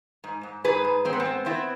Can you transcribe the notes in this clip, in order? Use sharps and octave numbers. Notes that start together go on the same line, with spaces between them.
G#2
G#2
G#2 G#4 B4
G#2
G#3 C4
B3
C4
B3
B3 C4 E4